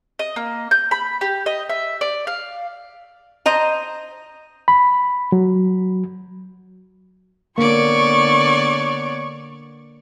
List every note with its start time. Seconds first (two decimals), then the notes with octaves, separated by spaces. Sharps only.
0.19 D#5
0.36 A#3
0.71 G6
0.91 B5
1.21 G4
1.46 D#5
1.69 E5
2.01 D5
2.27 F5
3.46 C5 D#5 A#5
4.68 B5
5.32 F#3
7.58 D3 A#3 B3 C#5 D5 C#6